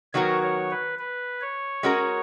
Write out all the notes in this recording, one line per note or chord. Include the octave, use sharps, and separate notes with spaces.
D#3 F#3 B3 F#4 A#4 C#5
C#5
B4
B4
C#5
G#3 C#4 F#4 A#4